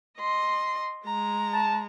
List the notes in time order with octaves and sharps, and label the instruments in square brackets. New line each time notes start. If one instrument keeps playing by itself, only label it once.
[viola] D#5 C6
[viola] G#3 [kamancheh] A#5
[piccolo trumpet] A5